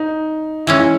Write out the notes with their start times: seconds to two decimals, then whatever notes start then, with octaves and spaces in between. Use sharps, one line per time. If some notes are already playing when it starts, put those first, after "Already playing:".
Already playing: D#4
0.67 E3 G#3 C#4 E4
0.79 E4